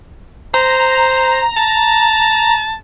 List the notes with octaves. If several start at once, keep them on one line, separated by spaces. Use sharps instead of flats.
C5 A#5
A5